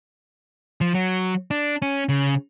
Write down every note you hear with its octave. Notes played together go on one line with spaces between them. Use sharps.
F3
F#3
D4
C#4
C#3